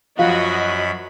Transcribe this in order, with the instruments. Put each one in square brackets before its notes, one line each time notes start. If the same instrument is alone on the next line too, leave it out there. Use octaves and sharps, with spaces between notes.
[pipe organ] F#2 B5 [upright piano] F3 [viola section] F#4 D#5 [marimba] F5